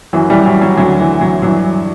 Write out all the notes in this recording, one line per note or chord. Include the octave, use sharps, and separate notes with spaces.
F#2 E3 F#3
E3 G3
F#3
F#3
D2 D3 F#3
E3
F#3
G2 E3 F#3